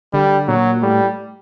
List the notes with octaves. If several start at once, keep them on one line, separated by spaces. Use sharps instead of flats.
D3 G3
A#2 F#3
A2 G3